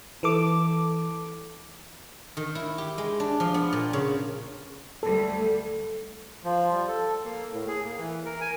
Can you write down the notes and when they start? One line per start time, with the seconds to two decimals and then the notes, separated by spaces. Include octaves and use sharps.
0.23 E3 A4 D6
2.37 D#3
2.55 E4
2.78 G4
2.98 G#3
3.20 D4
3.40 F3
3.54 B3
3.73 A#2
3.93 C#3
5.03 D2 G3 A4
6.44 F3
6.71 G3
6.88 A4
7.25 A#3
7.53 A2
7.68 G#4
7.84 A#3
7.98 E3
8.25 A#4
8.41 G#5